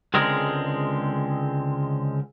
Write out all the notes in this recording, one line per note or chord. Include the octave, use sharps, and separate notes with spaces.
C#2 D3 G#3 C4 G#4 A#4